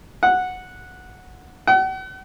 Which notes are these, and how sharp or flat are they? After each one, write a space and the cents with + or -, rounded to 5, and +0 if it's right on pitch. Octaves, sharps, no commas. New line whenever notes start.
F#5 -10
F#5 +40